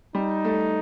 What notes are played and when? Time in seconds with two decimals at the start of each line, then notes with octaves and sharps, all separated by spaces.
0.15 G3 D#4
0.45 A3